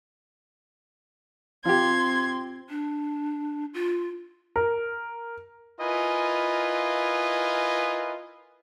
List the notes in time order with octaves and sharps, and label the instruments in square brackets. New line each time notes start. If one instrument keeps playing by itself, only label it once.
[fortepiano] F3 G4 [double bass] C4 [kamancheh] C6 [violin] G#6
[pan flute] D4
F4
[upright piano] A#4
[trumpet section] E4 F4 A#4 B4 D#5 G#5